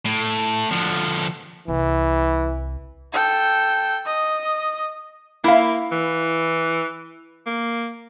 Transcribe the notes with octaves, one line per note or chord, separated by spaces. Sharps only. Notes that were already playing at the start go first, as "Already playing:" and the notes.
A2
D3 F3
C2 E3
A4 G5
D#5
A#3 E4 F5
E3
A#3